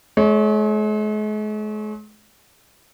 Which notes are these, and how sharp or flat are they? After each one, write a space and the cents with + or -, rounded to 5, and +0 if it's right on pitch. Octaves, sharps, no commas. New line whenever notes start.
G#3 +45 C#5 +5